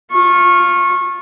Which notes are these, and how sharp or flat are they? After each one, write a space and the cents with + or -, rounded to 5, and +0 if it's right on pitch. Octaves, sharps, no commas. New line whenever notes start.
F4 +0 C#6 -25